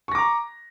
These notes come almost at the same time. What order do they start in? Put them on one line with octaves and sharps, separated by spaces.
C#6 A#6 D6 A#5